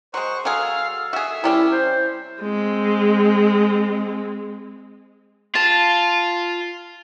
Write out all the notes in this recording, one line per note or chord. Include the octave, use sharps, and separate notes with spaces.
F#3 G#3 C5 C#6 F#6
F#3 F#4 G#4 A4 F5
F#4 G#4 E5
C3 G3 C#4 E4
C5
G#3 C4
F4 A5